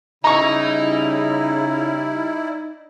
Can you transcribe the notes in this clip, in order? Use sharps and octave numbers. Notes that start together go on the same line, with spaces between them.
C#3 G3 D#4 E4 A#5 C#6